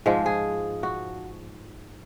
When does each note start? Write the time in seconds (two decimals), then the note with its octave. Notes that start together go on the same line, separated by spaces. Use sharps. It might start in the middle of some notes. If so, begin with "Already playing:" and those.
0.06 G#2 F3 G#3
0.26 G#4
0.83 F#4